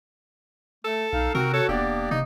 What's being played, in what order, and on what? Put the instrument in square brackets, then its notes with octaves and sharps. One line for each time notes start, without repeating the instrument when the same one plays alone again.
[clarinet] A3 [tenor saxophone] A4
[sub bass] B1 [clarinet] D#4 [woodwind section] F5
[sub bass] C3 [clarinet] C4 [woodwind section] F#4 [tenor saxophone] A#4
[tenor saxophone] A4 [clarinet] C#5
[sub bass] E1 [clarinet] A#3 [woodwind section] B3 D4 D5 [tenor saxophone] G4
[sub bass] C3 [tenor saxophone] D#4